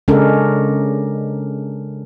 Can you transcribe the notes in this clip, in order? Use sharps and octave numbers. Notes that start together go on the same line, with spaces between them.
C#3 G#3 C#4 D4 A4 A#4